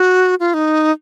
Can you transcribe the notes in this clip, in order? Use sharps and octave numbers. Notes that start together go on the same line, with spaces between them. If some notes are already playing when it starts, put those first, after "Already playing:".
Already playing: F#4
F4
D#4